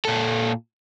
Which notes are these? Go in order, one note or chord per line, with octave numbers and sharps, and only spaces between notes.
A#2 A4